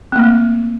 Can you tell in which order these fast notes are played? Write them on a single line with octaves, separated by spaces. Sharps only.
C4 A#3 A3